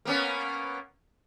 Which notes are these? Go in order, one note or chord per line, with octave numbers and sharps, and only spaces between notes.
A#3 B3 C#4